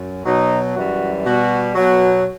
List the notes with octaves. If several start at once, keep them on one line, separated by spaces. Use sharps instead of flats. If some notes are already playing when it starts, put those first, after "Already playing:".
Already playing: F#2
B2 F#3 D#4
F#2 E3 G3 F#4
B2 G3 F#4
B2 F#3 F#4